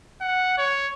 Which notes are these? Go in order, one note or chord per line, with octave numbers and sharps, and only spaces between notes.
F#5
C#5